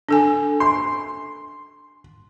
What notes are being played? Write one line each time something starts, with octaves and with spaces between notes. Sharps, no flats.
D4 A4 G#5
C6